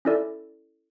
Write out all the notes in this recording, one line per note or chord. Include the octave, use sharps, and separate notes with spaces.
C#4 E4 A4 D5